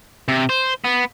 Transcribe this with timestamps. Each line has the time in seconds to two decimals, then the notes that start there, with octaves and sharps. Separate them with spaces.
0.28 C3
0.49 C5
0.84 B3